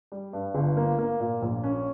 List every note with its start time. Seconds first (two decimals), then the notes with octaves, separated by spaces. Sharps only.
0.12 G3
0.33 G2
0.55 G1
0.77 A#3
0.98 A#3
1.20 A#2
1.42 A#1
1.63 C#4